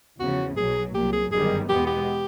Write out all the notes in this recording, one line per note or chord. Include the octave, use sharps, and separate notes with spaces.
E2 C#3 F3 F#4
B1 B2 F#3 G#4
C2 A#2 F#3 G4
G#4
G1 F#2 D#3 G3 G#4
E2 B2 G#3 B3 G4
G4